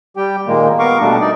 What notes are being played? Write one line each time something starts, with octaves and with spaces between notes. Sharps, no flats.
G3 G4 G5
A#2 D#3 G#3 A#3
B3 A#4 F5 C#6 D6
B2 G3 A3 D4
D#4 D5